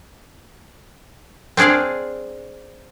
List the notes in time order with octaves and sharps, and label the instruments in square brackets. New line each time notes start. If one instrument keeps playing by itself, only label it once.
[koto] C4 D4 G#4 D5 F5